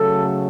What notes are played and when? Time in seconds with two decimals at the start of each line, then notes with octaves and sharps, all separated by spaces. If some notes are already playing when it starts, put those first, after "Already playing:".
Already playing: C#3 F#3 A3 A4